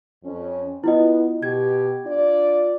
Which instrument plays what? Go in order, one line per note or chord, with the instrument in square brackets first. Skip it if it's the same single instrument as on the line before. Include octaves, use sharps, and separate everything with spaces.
[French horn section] F2 C#4
[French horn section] B3 [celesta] E4 F4 D#5
[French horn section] B2 G4 [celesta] G#6
[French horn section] D4 F4 D5